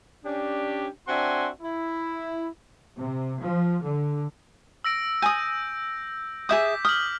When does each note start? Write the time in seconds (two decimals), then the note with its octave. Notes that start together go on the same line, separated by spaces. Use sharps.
0.25 C#4 D4 G4
1.08 C4 D4 F#4 E5 G#5 C6
1.62 E4
2.98 C3
3.42 F3
3.83 D3
4.84 E6 A#6 D7
5.22 G#5 D#6 G6
6.49 G#4 E5 D6 D#6 G6 B6
6.85 D#6 F6 F#7